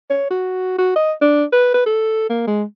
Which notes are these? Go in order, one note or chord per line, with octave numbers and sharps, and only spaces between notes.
C#5
F#4
F#4
D#5
D4
B4
B4
A4
A#3
G#3